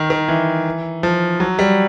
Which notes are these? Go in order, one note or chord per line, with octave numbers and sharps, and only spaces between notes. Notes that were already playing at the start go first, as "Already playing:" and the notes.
Already playing: D#3
D#3
E3
F3
F#3
G3